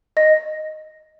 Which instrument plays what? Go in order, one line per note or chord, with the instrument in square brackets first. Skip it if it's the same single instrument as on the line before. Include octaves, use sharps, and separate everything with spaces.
[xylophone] D#5 A#6